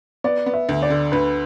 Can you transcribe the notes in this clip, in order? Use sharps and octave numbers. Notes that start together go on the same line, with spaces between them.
B3 D5
B3
E5
D2
D5
D3
D2 B4